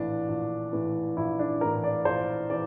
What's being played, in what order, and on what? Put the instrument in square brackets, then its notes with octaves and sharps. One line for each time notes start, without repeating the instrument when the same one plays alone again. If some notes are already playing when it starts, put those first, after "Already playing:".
Already playing: [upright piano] A#1 A2 E3 D4
A#1
A2 E3
A#1 E4
D4
A2 E3 A#4
D5
A#1 C5
E3 D5